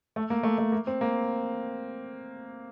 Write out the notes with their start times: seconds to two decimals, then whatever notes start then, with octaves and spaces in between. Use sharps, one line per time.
0.16 A3
0.30 A#3
0.43 A3
0.58 A3
0.72 A#3
0.87 C4
1.01 A#3